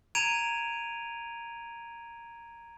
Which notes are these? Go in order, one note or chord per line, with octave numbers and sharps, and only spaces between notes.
A#5 G#6 D7 D#7 F7